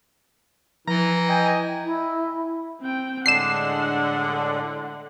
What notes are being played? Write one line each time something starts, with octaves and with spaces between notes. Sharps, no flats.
E3 F3 A#5
D#5 G5 G#5
E4
C4 G5
A2 D3 G#3 D4 F#5 C7 E7